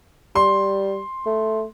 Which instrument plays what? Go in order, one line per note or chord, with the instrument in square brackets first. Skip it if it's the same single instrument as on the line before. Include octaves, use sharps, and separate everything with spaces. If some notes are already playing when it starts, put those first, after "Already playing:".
[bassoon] G3 [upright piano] C6
[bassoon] A3